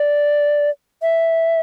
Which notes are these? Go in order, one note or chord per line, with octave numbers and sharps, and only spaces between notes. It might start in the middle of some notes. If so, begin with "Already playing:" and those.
Already playing: D5
E5